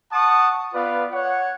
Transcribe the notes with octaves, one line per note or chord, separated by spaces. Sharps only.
F#5 A5 C#6 D#6
B3 F4 B4 D5 F5
C#5 F#5